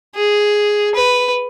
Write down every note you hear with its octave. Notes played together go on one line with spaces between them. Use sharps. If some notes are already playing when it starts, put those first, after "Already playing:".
G#4
B4